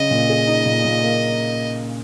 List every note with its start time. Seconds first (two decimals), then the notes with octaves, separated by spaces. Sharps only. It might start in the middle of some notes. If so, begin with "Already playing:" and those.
Already playing: C#3 D#5
0.11 A#2
0.30 G#4
0.47 D#4
0.65 A#2
0.85 A#2
1.03 A#3